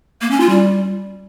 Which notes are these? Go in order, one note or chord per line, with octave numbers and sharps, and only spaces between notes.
A#3
C#4
F4
G3